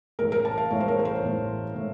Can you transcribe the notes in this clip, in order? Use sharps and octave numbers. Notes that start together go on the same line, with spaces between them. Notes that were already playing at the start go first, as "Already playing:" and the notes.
A1 A2 A3 A#4
A#4
A5
F5
A1 A2 A3 C#5
C5
A#4
A#4
C5
A1 A2 A3
A2 A3